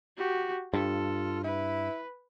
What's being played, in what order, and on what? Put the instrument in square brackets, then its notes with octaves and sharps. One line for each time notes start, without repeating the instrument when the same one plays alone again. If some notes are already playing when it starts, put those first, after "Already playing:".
[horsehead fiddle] F#4 G4
[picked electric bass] G2 [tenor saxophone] F4 [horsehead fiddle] A4
[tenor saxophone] E4 [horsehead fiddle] B4